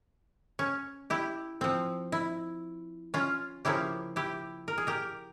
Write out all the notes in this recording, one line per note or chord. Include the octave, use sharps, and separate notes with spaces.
C#4
E4 G4
F3 C4
E4
C#4 F4
C#3 F3 A#3 C#4 E4 G4
E4 G4
A#4
G#4
G4 A#4